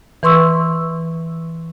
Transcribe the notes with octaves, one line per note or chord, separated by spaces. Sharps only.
E3 B4 C6 C#6 E6